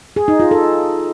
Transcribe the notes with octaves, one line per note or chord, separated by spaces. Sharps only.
G#4
D#4
F4
A4